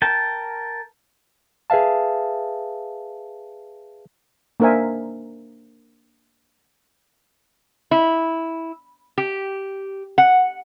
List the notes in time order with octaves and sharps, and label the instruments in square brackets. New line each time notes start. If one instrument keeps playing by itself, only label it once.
[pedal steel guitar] A#4 G5 A5
[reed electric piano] G#4 B4 E5 F5 A5
[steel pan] A#3 D4 A#4 C5 E5 G#5
[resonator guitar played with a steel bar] E4
G4
F#5